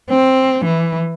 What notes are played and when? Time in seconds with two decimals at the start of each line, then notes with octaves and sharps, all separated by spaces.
0.10 C4
0.65 E3